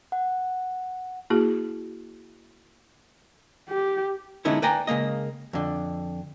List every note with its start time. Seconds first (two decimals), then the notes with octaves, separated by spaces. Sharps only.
0.12 F#5
1.30 A#3 E4 F#4 G#4
3.69 G4
4.45 D3 G#3 B3 C#4 D#4 E4
4.62 B4 D5 G5 G#5 A#5
4.87 C#3 G#3 A#3 D#5
5.53 F2 D3